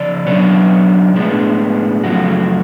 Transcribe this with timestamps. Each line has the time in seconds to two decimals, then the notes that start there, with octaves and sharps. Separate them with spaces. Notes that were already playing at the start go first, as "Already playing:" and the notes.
Already playing: C#3 F3 D5
0.26 B2 F#3 B3 D4 C#5
1.15 A2 G#3 B3 D4
2.04 F#2 C#3 F3 A3 F#4